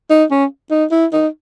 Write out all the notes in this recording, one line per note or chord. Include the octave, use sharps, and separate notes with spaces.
D#4
C#4
D#4
E4
D#4